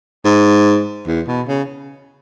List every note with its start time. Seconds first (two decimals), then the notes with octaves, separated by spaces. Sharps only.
0.25 G#2
1.07 E2
1.28 B2
1.48 C#3